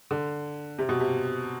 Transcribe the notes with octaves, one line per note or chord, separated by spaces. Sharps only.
D3
C3
B2
C3